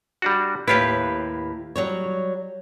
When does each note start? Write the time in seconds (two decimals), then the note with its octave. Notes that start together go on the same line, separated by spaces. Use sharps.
0.22 G3 D4 F#4
0.68 D#2 A2 E4 F4 G4 B4
1.76 F#3 G3 C#5